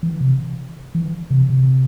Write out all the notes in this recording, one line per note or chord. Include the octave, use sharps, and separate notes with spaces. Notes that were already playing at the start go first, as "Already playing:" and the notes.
E3
C3
E3
C3
C3